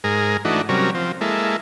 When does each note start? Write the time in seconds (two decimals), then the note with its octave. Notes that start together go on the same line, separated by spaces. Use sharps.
0.04 G#2 G#4 A#4
0.45 E3 A3 D4 D#4 F#4
0.69 C3 F#3 G3 C#4 A#4
0.95 F3 C4
1.21 G#3 A#3 E4 A4